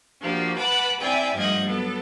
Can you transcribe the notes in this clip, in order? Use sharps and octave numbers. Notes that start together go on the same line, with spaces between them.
F3 A#3 D4 F#4 G4
B4 F#5 A5 B5 D6
C4 E4 D5 E5 G5 G#5
G2 F3 A3 D#5 F#5 G#6
F#3 B3 A4